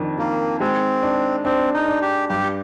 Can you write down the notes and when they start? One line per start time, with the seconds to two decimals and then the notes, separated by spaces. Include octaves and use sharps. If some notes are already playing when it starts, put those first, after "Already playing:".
Already playing: F2 D#3 D4
0.18 D#3 A#3
0.60 G#3 C4
1.03 D4
1.45 C4 D4
1.74 D#4
1.88 D4
2.02 G4
2.29 G2 G4